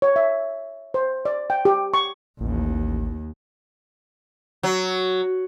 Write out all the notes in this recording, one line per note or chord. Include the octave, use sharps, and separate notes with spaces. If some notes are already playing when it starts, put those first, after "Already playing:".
C#5
E5
C5
D5
G5
G4
C#6
A1 D#2
F#3